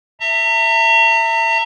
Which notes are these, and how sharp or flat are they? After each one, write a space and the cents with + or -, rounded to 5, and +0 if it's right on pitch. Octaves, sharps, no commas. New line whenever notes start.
E5 +0 A#5 -40